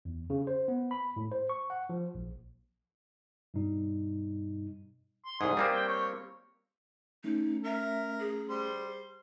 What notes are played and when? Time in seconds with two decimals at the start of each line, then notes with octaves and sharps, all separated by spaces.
0.05 E2
0.30 C#3
0.47 C5
0.68 B3
0.91 B5
1.16 A2
1.32 C5
1.49 C#6
1.70 F#5
1.89 F3
2.15 A#1
3.54 G2 B2 G3 D#4
5.26 C6
5.41 C2 G#2 G#4
5.57 G3 A#3 C4
5.72 G5
5.88 C#5
7.24 A3 C#4 D#4
7.64 A#4 E5
8.19 G#4
8.49 G3 C5